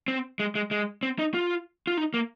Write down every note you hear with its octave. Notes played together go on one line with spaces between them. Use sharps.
C4
G#3
G#3
G#3
C4
D#4
F4
F4
D#4
A#3